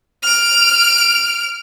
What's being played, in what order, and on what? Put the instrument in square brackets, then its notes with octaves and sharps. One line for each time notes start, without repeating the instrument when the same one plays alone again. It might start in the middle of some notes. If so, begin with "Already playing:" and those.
[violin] F6 D7